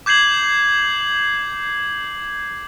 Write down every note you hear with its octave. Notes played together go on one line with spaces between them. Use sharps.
D6 G6 G#6 C7 F#7